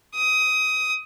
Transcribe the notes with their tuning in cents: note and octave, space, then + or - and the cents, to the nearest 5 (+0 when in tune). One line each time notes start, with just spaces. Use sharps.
D#6 +20